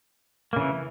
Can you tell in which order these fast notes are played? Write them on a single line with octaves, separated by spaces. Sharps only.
A#3 C#3 E3